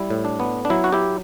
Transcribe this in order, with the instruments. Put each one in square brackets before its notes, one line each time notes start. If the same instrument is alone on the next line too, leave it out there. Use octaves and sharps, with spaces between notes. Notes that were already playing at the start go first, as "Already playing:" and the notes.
Already playing: [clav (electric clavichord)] G3 E4
A2
D4
B3
D4
F#3 E4
F#4
E4 G4